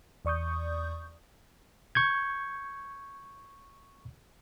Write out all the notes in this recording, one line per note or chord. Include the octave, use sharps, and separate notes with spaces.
E2 D5 C#6 D#6 G6
C#6 G6 G#6